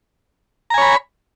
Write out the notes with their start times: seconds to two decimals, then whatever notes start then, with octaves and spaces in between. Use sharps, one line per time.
0.70 A#5
0.74 G#5
0.78 C#5
0.81 B5